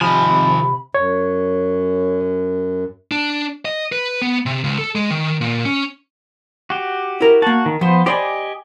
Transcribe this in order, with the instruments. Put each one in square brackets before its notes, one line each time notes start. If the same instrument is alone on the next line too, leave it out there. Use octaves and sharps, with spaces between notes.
[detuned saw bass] C3 [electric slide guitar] D#3 G#5 [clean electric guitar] F3 [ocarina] B5
[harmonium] F#2 [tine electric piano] C#5
[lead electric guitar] D4
D#5
B4
B3
C3
C#2
A4
G#3
D#3
A#2
C#4
[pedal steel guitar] F#4 G4
[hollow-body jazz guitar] E4 A#4
[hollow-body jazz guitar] A#3 A5 [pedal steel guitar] F#4
[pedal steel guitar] D#3
[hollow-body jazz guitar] F3 [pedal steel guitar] B3 C5
[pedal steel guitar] G4 D#5 G#5 [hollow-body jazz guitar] C5 D5 B5